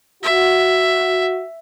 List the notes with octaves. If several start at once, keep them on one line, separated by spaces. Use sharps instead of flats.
F#4 E5